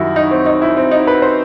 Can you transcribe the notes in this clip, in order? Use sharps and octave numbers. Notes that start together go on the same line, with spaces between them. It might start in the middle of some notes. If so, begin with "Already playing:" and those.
Already playing: F#2 D#3 G3 E4 F#4
D#4
C4
D#4
E4
C4
D#4
B4
C5